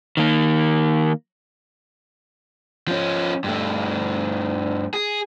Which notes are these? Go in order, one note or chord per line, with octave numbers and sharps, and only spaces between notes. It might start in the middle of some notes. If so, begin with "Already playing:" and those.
D#3 A#3
F3 C#4
G2 A3
G#4